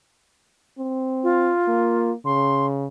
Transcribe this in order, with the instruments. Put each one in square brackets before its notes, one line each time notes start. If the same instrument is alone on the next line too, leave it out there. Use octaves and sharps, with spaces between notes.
[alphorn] C4
[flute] F4
[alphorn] A#3
[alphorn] C#3 [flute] C6